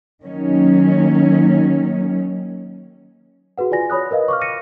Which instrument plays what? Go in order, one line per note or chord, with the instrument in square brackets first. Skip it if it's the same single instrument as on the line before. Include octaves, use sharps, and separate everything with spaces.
[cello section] D#3 F#3 A#3 C#4
[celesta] F#4 G#4 B4 F#5
F4 D5 G#5 A#6
C#5 B5 D#6 F#6
A#4 B4 D#5 F5
C#6 D6 F6
A#6 C#7 D#7